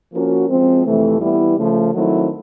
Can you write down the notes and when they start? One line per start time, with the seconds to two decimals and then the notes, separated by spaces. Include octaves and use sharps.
0.13 F3 A#3 C#4 F#4 A#4
0.48 F3 G#3 C4
0.84 F2 C3 E3 A3
1.20 E3 G3 B3 E4
1.57 C#3 F3 A3
1.93 D#3 F#3 A3 C4 E4